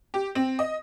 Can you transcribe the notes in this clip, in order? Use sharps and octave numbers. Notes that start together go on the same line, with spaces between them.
G4
C4
D#5